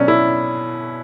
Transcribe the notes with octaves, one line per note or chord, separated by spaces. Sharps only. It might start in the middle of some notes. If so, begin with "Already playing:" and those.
Already playing: B2 F#3 C#4 D4
E4